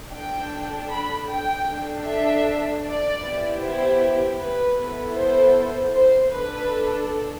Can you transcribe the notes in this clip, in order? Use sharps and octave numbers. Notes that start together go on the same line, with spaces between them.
D4 A4 G5
B5
G5
D4 A4
E5
D5
B3 E4 G4
C5
B4
B3 E4 A4
C5
C5
D4 A4 B4